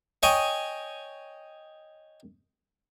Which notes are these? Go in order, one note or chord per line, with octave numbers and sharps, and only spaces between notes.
C#5 D#5 G5 G#5 C#6 D#6